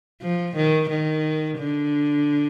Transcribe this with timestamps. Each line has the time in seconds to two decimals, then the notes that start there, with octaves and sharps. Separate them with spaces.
0.22 F3
0.56 D#3
0.90 D#3
1.58 D3